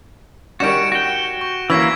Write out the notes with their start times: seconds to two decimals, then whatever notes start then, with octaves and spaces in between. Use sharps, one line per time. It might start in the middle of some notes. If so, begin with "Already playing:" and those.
0.60 D#3 G3 C#4 F#4 D7 E7
0.92 F#4 G5
1.41 C#6
1.70 E3 A#3 C#4 E6 G#6 B6